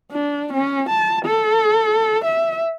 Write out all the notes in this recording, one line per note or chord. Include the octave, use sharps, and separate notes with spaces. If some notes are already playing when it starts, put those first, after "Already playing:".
D4
C#4
A5
A4
E5